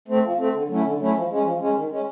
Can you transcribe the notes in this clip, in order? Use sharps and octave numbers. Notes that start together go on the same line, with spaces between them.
A3 C4
F3
A3 C4
D3
F#3 A3 C#4 E4
D3
F#3 A3 C#4 E4
F3
G#3 C#4
F3
G#3 C#4
D#3
G#3 C#4